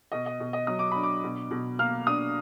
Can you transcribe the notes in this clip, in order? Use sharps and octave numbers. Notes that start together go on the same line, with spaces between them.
B2 D#5
D#5
B2
D#5
F#3 D#6
D6
D4 B5
D6
B2
B2
A#3 F6
D4 D#6